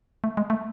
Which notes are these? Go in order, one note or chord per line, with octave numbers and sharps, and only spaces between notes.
A3
G#3
A3